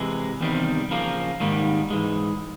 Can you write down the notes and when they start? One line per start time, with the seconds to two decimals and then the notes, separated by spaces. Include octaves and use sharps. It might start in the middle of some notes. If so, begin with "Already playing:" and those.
Already playing: C3 E3 G#3
0.41 E2 C3 D#3 G3 C4
0.91 C#3 F3 A#3
1.40 G#2 D#3 G3 A#3
1.90 G#2 E3 G#3